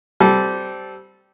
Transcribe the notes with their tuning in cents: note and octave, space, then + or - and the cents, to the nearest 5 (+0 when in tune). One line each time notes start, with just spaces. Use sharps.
G3 -15 C4 -15 A4 -15